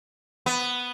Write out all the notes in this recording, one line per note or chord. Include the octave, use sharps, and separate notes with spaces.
B3